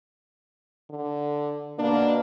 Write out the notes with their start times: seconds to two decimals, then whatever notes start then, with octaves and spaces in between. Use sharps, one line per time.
0.90 D3
1.79 B2 A#3 D4